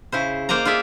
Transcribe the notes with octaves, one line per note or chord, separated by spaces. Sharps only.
C#3 E4 C5
A#3 C5 D5 D#5 A#5
F4 G#4 D5 E5